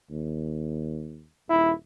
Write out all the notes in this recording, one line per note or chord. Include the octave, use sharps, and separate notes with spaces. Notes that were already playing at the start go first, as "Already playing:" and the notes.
D#2
D#1 E4